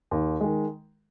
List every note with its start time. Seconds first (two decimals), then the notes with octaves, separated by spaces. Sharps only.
0.11 D#2
0.41 D#3 G#3